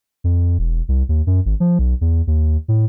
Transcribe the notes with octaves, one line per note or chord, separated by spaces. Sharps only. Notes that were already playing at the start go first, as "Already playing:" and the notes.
F2
E1
C2
D#2
F#2
G#1
F3
B1
E2
D#2
A2